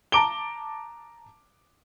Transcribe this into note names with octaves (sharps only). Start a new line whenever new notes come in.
A5 A#5 D6 D7 G7